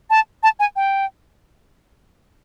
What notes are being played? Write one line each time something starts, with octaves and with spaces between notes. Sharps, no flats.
A5
A5
G#5
G5